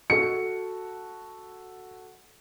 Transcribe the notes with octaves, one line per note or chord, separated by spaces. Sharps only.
F#4 A4 C#7